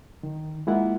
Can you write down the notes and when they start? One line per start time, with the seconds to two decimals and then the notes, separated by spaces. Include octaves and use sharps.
0.23 D#3
0.67 G#3 A#3 E4 F4 F#5